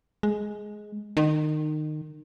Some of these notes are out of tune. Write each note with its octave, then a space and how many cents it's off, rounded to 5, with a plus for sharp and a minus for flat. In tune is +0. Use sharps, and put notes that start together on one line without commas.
G#3 +10
D#3 -25